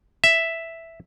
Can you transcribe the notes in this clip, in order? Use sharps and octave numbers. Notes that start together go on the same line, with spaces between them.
E5